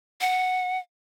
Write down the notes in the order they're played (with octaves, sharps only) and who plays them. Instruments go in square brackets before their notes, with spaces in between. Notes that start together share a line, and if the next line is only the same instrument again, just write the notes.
[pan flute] F#5